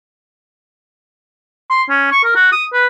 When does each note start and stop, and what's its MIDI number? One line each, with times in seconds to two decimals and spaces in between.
1.70 1.83 84
1.90 2.08 61
2.12 2.22 85
2.24 2.35 70
2.36 2.50 66
2.52 2.65 87
2.73 2.87 71